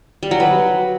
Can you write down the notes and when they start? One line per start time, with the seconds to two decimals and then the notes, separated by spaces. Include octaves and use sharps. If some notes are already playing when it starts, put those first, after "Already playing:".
0.23 G3
0.31 F#3
0.40 B4